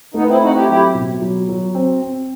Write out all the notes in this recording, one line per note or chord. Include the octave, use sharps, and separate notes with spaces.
A3 B3 D#4
C4 E4
C4 D#4 F#4
E4 G4
F#3 E4 G4
B2
F#3
F#3
C4
C4